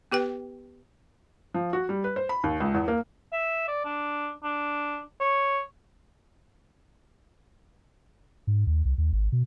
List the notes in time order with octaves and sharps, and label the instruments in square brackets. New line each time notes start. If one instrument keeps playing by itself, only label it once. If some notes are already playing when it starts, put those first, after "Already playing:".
[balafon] B3 G4 B4 G5
[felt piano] F3
F#4
G3
B4
C5
B5
D#2
C#2
E2
A#3
[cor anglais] E5
D5
D4
D4
C#5
[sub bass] G#2
D#2
C2
D#2
G#1
B2